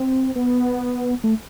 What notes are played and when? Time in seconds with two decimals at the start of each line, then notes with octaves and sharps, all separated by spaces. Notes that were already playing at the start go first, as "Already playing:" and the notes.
Already playing: C4
0.36 B3
1.24 A3